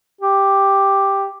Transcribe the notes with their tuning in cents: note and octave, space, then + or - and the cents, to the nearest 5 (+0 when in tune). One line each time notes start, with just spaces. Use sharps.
G4 +5